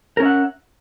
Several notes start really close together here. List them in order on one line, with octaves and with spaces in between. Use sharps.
A#4 C#4 E5 F#5